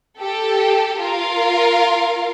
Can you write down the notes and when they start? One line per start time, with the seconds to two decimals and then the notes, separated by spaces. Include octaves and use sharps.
0.20 G4 A4
1.00 F4 A#4 F5